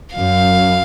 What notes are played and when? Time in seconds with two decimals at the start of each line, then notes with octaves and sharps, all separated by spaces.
0.15 F#2 F5